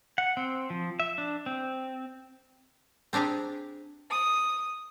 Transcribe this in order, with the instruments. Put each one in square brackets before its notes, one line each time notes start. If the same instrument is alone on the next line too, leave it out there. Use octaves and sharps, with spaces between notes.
[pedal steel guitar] F#5
C4
F3
E5
D4
C4
[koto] C4 D4 G4 G#4 A#5
[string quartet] D#6